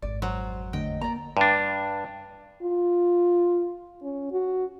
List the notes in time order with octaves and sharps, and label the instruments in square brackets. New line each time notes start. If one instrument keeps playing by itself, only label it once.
[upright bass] G#1 F2 [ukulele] D5
[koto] F#3 [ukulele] C5
[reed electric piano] E2 D3 A3 [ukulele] D#5 [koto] G5
[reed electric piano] A#3 [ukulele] D5 A#5
[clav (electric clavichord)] G2 D4
[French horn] F4
C#4
F#4